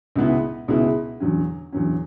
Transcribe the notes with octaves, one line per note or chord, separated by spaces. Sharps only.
C#2 B2 G#3 B3 E4
C#2 B2 G#3 B3 E4
E2 D3 F#3 C#4
E2 D3 F#3 C#4